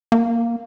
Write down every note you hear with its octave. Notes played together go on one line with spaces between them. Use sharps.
A#3